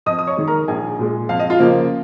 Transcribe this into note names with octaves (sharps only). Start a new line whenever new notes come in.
F2 D#5 D#6
D#6
C#5 C#6
D#3 G#3
A#4 A#5
A#1 G#4 G#5
A#2 G#3
F2 F5
D#5
F4 F5
C#3 F3 A#3